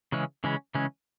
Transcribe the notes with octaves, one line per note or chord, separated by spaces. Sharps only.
C#3 E3 G#3 C#4
C#3 E3 G#3 C#4
C#3 E3 G#3 C#4